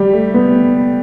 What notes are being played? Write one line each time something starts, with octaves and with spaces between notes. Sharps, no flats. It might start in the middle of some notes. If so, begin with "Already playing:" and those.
Already playing: G3 G4
A3
B3